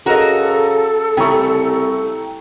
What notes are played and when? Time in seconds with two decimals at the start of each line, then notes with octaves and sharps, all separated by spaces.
0.06 C#3 F#4 A4 A#4 D#5 A#5
1.17 C2 C#3 A3 G5 A#5 C#6